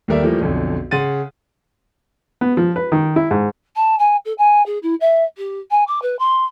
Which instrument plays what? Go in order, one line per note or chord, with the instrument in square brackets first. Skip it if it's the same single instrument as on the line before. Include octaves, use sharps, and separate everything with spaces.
[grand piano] D#2 G3 A3 A#4 D5 E5
E3 F3 G3 A3 A#3
B1 F2 D3
C#3 F#5 C6 A6 D#7
[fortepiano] B3
F3
B4
D#3
E4
G#2
[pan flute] A5
G#5
A4
G#5
G#4
E4
E5
G4
G#5
D6
B4
C6